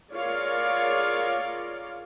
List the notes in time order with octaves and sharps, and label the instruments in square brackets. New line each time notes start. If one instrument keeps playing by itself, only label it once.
[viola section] F4 G#4 A#4 C#5 D5 F5